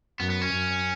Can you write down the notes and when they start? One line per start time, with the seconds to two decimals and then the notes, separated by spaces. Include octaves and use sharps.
0.20 F#2 B3
0.30 B3
0.42 C#4
0.53 F#2